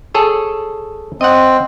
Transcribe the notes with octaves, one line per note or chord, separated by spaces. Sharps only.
G#4 A4 C#5
C4 D#5 F#5